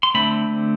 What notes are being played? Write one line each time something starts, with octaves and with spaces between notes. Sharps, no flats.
C6
D3 A3 C4 B5